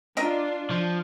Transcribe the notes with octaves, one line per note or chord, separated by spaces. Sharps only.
D4 F4 A#4 D#5 E5
F3